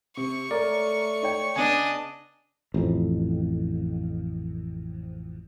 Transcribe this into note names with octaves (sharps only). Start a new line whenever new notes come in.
C3 C#6
A3 A#4 C#5 D5
D#4 C#5 G5
C#3 B3 D4 D#5 G#5
A1 F2